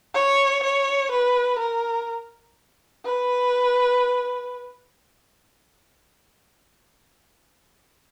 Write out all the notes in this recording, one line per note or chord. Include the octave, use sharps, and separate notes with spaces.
C#5
C#5
B4
A#4
B4